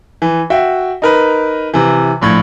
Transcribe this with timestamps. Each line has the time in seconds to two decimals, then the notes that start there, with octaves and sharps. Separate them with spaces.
0.22 E3
0.50 F#4 E5 G5
1.02 D#4 A#4 B4
1.74 C3 E3
2.21 A#1 A2 G#6